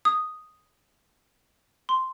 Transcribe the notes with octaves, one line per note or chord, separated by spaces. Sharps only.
D#6
C6